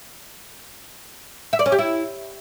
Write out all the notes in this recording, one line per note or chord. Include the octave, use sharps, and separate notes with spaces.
E5
D5
C#4
G4
E4